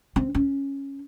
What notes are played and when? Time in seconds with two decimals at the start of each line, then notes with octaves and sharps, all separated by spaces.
0.16 C4
0.35 C#4